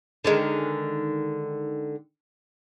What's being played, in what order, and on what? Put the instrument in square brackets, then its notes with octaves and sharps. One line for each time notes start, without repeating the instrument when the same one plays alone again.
[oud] D3 D#3 G#3